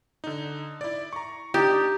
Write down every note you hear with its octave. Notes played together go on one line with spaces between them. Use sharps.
D3 D#4
E4 D5
A#5 C#6
D4 D#4 G4 A#5 G6 A6